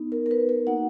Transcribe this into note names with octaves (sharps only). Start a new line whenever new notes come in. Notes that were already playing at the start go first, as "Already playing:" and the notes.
Already playing: B3 D#4
A#4
A#4
B4
A#4
A#3 D#4 F#4 F#5